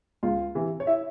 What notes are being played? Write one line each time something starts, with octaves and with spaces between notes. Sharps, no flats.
C#2 F4
C3 E3
C#5
E4 E5